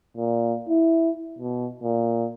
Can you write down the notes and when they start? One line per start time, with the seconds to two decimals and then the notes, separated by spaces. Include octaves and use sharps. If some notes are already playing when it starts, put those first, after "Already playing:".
0.17 A#2
0.68 E4
1.39 B2
1.83 A#2